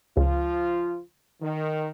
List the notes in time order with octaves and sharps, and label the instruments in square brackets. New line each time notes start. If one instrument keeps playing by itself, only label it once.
[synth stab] C#2 [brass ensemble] F3 F4
[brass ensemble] D#3